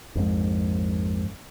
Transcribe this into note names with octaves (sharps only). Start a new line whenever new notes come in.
A#1 F2 G#2